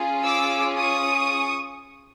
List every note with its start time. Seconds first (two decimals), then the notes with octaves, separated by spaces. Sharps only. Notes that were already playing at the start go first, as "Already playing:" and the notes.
Already playing: C#4 F4 G#4
0.23 D6 E6
0.77 C#6 D#6